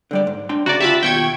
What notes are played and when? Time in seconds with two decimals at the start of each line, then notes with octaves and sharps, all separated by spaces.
0.11 D3 G3 D5
0.27 G#2
0.49 D4 G5 C6
0.66 D2 C#3 F#4 D5 A#5
0.80 F4 G4 E5 A5 B5
1.03 D#2 B2 G5 C#6 G#6